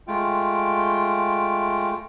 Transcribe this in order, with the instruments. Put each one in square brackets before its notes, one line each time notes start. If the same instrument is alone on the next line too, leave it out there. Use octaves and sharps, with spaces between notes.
[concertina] G#3 A3 F4 G5